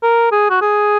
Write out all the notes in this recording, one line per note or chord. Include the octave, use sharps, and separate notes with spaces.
A#4
G#4
F#4
G#4